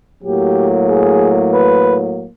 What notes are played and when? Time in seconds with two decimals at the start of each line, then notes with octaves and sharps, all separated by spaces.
0.24 A2 F#3 A#3 G4
0.87 G#4
1.52 B4